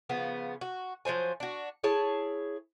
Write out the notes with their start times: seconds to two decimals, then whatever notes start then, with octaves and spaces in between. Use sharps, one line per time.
0.09 C#3 F3 B3
0.61 F#4
1.05 F3 F#3 C5 G#5
1.40 D4 F#4
1.84 E4 G#4 C#5 A5